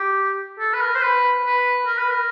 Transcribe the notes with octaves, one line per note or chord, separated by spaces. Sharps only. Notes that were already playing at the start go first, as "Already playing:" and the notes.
Already playing: G4
A4
B4
A#4
C5
B4
B4
A#4
B4
A#4